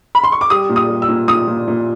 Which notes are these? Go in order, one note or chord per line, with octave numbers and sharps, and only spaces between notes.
B5
C6
C#6
D6
G3 D#6
A#2
D#6
G3
E6
A#2
A#2 D#6
A#2
A#2